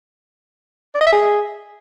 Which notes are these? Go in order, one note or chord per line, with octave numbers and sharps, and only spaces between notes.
D5
D#5
E5
G#4